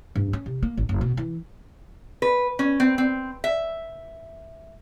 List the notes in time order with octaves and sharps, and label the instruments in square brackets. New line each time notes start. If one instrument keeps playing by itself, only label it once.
[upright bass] G2
C#4
C3
A#3
G#1
F#1
B2
E3
[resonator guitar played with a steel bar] B4
C#4
C4
C4
E5